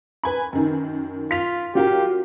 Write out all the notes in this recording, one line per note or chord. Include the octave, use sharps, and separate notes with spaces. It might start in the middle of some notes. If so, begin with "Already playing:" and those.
B4 G#5 B5
F#2 D#3
F4 B6 F7
F#3 F4 G4 A#4